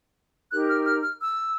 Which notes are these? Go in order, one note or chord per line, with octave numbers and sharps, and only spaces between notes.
D#4 G4 A#4 F#6
F6
F6
F6
E6